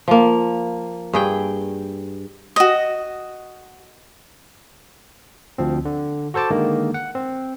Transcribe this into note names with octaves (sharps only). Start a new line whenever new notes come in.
F3 A#3
G2 G#4 G5
F#4 D#5
D2 F3 C4
D3
F#4 A4 C5 A5 D6
D3 D#3 G#3 A#3
F#5
C4